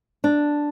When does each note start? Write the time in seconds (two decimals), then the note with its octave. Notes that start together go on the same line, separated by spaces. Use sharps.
0.24 D4